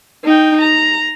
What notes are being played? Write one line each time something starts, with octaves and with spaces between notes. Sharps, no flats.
D#4 G5
A#5